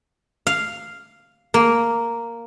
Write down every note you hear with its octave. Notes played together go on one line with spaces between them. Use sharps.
F5
A#3